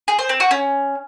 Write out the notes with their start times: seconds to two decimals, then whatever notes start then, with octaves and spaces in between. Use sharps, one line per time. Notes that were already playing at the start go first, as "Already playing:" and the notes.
0.08 G#4
0.19 C5
0.29 C4
0.40 F#4
0.51 C#4